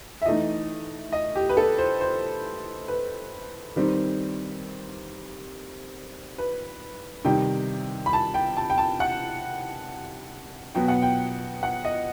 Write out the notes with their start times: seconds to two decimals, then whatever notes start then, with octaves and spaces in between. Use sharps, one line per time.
0.22 E5
0.26 E3 A3 D#4 D#5
1.13 D#5
1.36 G4
1.49 B4
1.57 A4
1.78 C5
2.01 C5
2.88 B4
3.76 D#3 G3 C4 D#4
6.38 B4
7.25 C3 D#3 G3 D#4 G5
8.06 B5
8.13 A5
8.34 G5
8.57 A5
8.70 G5
8.78 A5
9.00 F#5
10.75 B2 F#3 B3 G5
10.88 F#5
11.02 G5
11.63 F#5
11.85 D#5